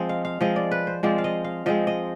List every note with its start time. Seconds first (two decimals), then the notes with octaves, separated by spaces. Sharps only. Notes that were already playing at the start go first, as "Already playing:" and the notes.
Already playing: F3 G#3 C4 D#5
0.09 F5
0.25 F5
0.41 F3 G#3 C4 D#5
0.56 D5
0.71 B4
0.87 C5
1.03 F3 G#3 C4 D5
1.18 F5
1.24 D#5
1.44 F5
1.66 F3 G#3 C4 D#5
1.87 D#5